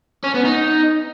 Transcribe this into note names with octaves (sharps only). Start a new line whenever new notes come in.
C#4
B3
D#4